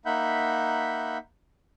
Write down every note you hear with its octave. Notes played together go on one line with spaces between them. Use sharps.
A#3 D#4 E5 F#5 B5 G6